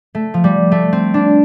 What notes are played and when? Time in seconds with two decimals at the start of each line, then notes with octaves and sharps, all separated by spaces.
0.15 A3
0.34 F3
0.44 G3
0.72 A3
0.93 C4
1.14 D4